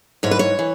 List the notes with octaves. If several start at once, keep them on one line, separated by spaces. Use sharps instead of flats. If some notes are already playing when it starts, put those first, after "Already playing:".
G#2 E3 C#5
B4
C#5
E3